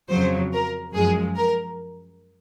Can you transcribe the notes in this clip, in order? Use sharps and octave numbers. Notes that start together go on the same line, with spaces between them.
F2 C#3 F#3 C5
A#4
F#2 F3 G#3 G#4
A#4